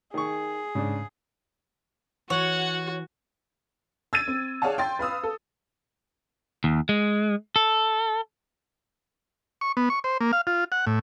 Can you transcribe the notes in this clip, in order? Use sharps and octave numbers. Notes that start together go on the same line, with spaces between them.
D#3 G#4 C#6
G#2 C#3 D4
E3 F#4 C#5 F#5
E6 G#6 A6 D#7
C4
G#4 C#5 D5 F5 F#5 A5
G5 C6 A6
B4 F5 D#6 E6
A4
D#2
G#3
A4
C#6
B3
C#6
C5
A#3
F5
F4
F#5
A2